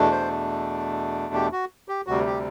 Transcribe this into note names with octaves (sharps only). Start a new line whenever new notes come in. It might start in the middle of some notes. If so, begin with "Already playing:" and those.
Already playing: E2 B2 A3 D4
C5
G4
F#4
G4
D2 C3 G3 F#4
G4